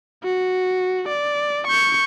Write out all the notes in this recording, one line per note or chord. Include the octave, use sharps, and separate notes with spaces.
F#4
D5
C#6 G6